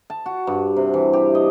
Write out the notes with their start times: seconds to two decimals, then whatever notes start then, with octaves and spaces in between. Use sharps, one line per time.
0.10 A5
0.26 F#4
0.47 G2
0.76 C3
0.94 E3
1.13 G4
1.35 D#5